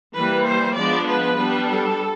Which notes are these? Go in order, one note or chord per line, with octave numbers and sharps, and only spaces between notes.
E3 G3 A#3 B4
C5
F3 G#3 B3 D4 D5
B4
G3 B3 D4
A4